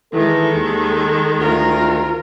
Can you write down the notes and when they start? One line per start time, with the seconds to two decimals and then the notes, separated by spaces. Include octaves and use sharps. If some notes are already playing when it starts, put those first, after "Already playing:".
0.13 D#3 E3 G#3 A4
0.55 D#2
1.39 D2 F4 A#4